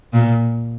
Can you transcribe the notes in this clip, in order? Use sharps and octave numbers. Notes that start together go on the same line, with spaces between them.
A#2